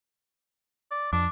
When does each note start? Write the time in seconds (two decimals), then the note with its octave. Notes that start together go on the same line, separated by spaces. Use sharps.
0.91 D5
1.13 F2 D4 D6